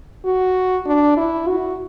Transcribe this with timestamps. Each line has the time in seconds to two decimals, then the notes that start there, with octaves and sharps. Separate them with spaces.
0.25 F#4
0.86 D4
1.17 E4
1.48 F#4